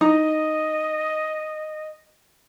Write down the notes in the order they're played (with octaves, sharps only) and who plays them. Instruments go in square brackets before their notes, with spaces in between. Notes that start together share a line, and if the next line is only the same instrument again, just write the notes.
[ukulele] D#4 [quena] D#5